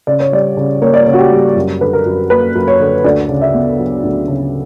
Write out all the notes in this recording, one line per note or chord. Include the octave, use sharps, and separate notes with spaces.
C#3 D5
C#5
G3 D5
C#3
A#3 C#5
D5
C#3 C#5
F#4
G4
G3
F#2
D3 B4
A#4
F#2
A#3 B4
F#2
C#5
D3
D2 D5
C#3
E5
B3
F#3
D2
C#3